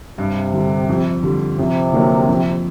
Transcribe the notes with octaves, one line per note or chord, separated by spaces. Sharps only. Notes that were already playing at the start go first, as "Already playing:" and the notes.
G2 C3
D3 G3
F2
D3 G3
F2 C3
D3 F#3 A#3 D4
F2